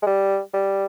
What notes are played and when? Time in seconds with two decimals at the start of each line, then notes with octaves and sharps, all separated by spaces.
0.02 G#3
0.07 G3
0.54 G3